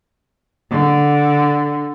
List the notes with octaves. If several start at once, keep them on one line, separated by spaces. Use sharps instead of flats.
D3